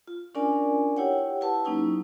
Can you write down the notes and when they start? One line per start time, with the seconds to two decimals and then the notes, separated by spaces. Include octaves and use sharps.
0.08 F4
0.35 C#4 D4 F4 A#4 D5 G#5
0.97 E4 G4 C#5 F#5 G5
1.41 E4 G4 B4 F#5 A5
1.65 F#3 A#3 C#4 D#4 E4